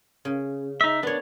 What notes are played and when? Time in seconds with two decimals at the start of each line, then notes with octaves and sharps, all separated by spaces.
0.25 C#3
0.81 D#4 E5
1.03 B3 D4 C#5